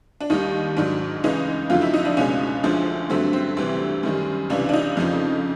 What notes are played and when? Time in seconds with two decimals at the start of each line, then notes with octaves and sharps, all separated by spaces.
0.21 D4
0.30 D#2 D#3 G3 D#4
0.77 G#2 D#3 F#3 D4
1.24 C#2 C#3 E3 G#3 D#4
1.70 F2 D3 F#3 A3 F4
1.82 E4
1.94 D#4
2.05 D4
2.17 C#2 B2 G#3 C#4
2.63 D2 D3 F3 G#3
3.10 G2 D3 F#3 A3 C4
3.33 C4
3.57 D2 C3 E3 G3
4.03 F#2 D#3 G3
4.50 C#2 C3 E3 D4
4.69 D4
4.73 D#4
4.97 F2 C#3 F3